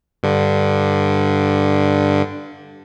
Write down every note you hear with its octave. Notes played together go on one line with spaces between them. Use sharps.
G2 D3